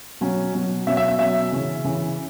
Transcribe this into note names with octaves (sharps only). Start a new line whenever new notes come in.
B2 F#3 C#4
B2 F#3 C#4
B2 F#3 C#4 E5
E5
E5
B2 F#3 C#4 E5
C#3 E3 C#4
C#3 E3 C#4